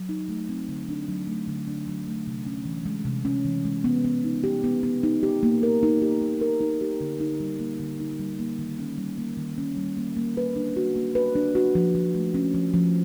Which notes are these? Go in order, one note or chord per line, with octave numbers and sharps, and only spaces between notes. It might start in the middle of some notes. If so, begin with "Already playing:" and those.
Already playing: F#3
D#4
A3
C4
D3
D4
F#3
A3
D3
D4
F#3
A3
C3
C#4
E3
G#3
C3
C#4
E3
G#3
B3
B3
D#4
G4
B3
B3
D#4
G4
A#3
A#4
D#4
G4
A#3
A#4
D#4
G4
D3
D#4
G3
A#3
D3
D#4
G3
A#3
D#3
C#4
G3
A#3
D#3
C#4
G3
A#3
A#3
B4
D4
F#4
A#3
B4
D4
F#4
F3
F3
A3
C#4
F3
F3